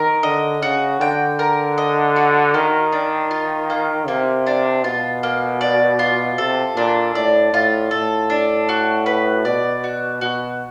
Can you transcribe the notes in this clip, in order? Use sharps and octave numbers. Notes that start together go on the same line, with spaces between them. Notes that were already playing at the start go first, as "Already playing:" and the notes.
Already playing: D#3 A#4
D3 D#5
C#3 F#4
D3 G5
A#4
D#5
F#4
D#3 A#3
D4
F4
A#3
C3 A#3
D4
B2 F4
A#3
D5
F4
C3 A4
A#2 D4
A2 D5
A2 F4
A2 A4
D4
F#4
B4
B2 D5
F#4
B2 F#4